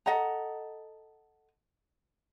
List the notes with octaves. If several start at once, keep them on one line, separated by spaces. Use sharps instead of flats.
A4 D#5 F#5 A#5